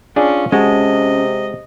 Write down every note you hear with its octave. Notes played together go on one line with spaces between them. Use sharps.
C#4 D4 F4 G#4 D5
C3 G#3 C#4 F#4 D#5 A5